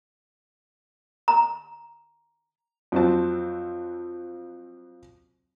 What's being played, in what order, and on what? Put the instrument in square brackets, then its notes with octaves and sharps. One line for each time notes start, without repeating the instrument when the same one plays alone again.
[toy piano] A#5
[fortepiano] F2 F#3 C4 A5